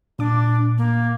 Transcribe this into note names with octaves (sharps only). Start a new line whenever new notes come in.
A#2 D4 D6
A#3